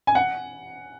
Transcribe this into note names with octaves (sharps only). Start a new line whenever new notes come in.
G#5
F#5